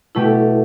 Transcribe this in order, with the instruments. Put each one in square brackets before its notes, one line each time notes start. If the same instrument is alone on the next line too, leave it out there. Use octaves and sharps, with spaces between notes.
[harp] B2 A3 G4 [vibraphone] E4 A4